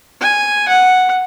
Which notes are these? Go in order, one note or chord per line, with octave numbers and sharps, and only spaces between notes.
G#5
F#5